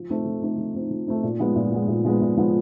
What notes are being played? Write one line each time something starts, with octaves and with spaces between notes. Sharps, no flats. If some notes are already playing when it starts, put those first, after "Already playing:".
Already playing: F3
A3 C4 D#4
F3
A3 C4 D#4
F3
A3 C4 D#4
F3
A3 C4 D#4
A#2
F3 G#3 B3
A#2
F3 G#3 B3
A#2
F3 G#3 B3
A#2
F3 G#3 B3